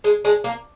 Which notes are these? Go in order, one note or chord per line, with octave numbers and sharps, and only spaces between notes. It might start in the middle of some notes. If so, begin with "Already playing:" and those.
G#3
G#3
A#3